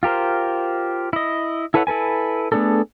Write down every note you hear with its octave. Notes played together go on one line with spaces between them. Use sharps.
F4 G4 A#4 C5
E4 D#5
E4 A4 B4 C#5 F#5
E4 A4 B4 G#5
A3 B3 D4 G#4 A4